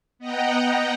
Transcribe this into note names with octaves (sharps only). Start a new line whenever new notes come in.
B3 D#5 F#5 G5 A#5